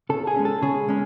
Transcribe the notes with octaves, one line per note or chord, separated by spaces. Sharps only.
C#3 A4
G#4
G#3 C#4
A4
C#3 G#4
G#3 C#4